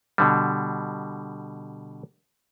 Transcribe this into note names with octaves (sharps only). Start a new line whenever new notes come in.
B2 D3 G3